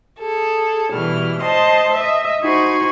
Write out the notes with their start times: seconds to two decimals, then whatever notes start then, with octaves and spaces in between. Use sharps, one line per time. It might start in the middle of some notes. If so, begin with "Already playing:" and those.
0.19 G#4 A4
0.92 B2 E3 G3 F6
1.40 C5 D#5 A5 C6
1.93 D#5 E5
2.42 D#4 F#4 C5 G#5 B5 C#6